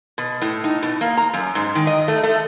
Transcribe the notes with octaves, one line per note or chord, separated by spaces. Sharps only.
B2
A2
D#4
B2
A#3
A#5
F#2
G#2
D#3
D#5
A3
A3